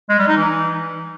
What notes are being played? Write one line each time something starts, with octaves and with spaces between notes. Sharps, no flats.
G#3
G3
D#4
E3